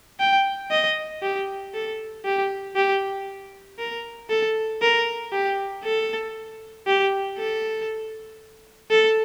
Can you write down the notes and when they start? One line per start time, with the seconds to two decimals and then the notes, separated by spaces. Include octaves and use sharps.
0.20 G5
0.71 D#5
1.22 G4
1.74 A4
2.25 G4
2.76 G4
3.79 A#4
4.30 A4
4.82 A#4
5.32 G4
5.84 A4
6.87 G4
7.38 A4
8.91 A4